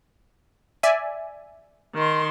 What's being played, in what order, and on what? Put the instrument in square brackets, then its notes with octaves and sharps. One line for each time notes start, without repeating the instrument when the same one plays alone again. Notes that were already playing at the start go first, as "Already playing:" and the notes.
[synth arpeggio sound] D5 E5 G#5
[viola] D#3 C6